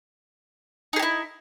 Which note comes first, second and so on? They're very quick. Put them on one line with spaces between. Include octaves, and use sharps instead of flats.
D#4 G#4 G4 E4